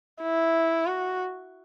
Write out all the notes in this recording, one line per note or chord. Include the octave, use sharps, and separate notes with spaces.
E4
F#4